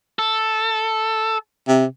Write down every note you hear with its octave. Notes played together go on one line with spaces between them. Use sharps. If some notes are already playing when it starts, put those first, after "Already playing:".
A4
C3